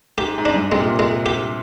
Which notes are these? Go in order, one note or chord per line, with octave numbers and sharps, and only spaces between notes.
G#2 G4
G#2
D4
G2
G#2
C3 G#3
A#2
G#3
G4